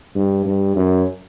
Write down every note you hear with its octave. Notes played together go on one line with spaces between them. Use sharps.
G2
G2
F#2